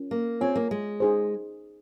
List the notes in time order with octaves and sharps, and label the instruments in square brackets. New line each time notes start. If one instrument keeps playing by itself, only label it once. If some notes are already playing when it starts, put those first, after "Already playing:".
Already playing: [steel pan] C#4 F4 A#4
[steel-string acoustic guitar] A#3
[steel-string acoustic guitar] C4 [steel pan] F4 G#4 C#5 G#5
[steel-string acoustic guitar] A#3
G#3
[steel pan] D#4 G#4 C5